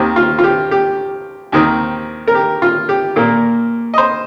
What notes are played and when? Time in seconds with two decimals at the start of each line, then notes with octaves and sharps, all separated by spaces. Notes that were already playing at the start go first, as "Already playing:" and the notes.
Already playing: D#2 D#3 C4 G4
0.16 F4
0.39 F4
0.44 G4
0.71 G4
1.52 D#2 D#3 C4
2.27 A#4
2.35 G4
2.62 F4
2.89 G4
3.16 A#2 A#3 A#4
3.94 D#5
3.98 C5